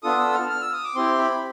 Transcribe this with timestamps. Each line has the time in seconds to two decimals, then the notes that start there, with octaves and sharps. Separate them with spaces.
0.03 B3 D4 F4 A4 D#6
0.19 E6
0.34 F6
0.50 F6
0.61 E6
0.73 D#6
0.84 D6
0.95 C4 E4 G4 C6
1.19 B5